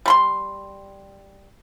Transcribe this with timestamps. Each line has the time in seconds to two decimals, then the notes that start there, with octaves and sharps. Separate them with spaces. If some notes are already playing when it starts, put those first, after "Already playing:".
0.06 G3 B5 C6